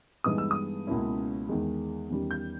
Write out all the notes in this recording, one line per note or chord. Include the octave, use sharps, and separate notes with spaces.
G2 E3 G#3 B3 D#4 D#6
E6
D#6
C#2 B2 A#3 C#4 E4
E2 D#3 G#3
E2 D#3 G3 C#4
G6